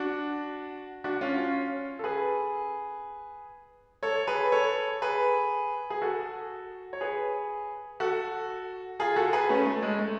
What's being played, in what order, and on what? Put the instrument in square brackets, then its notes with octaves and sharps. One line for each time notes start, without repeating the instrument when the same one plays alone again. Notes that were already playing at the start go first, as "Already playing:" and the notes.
Already playing: [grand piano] D4 F#4
D4 F#4
C#4 F4
C#4 F4
A4
G#4 B4
A4 C#5
G#4 B4
A4 C#5
G#4 B4
G#4
F#4 A4
C#5
G#4 B4
F#4 A4
F4 G#4
F#4 A4
G#4 B4
A3 C#4
A3
G#3
A3